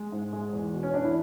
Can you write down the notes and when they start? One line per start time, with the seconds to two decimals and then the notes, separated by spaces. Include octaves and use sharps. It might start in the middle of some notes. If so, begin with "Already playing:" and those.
Already playing: G#3
0.12 G#2
0.33 G#3
0.53 E2
0.74 B2
0.83 C#4
0.94 E2 D4
1.04 E4